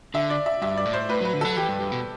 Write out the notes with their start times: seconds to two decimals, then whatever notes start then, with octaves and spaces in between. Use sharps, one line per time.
0.14 D3 E5
0.30 D5
0.46 E5
0.62 G2 E5
0.77 D5
0.85 A2
0.93 C5
1.09 A2 B4
1.21 F#3 B4
1.33 D3
1.41 F#3 A4
1.56 E3 G4
1.69 G2
1.80 G2
1.92 B2